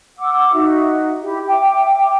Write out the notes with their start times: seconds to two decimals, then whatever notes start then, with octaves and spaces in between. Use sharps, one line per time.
0.18 F#5 D6 E6
0.53 D#4 F#4 E5
1.21 E4 G4
1.48 E5 G5 D6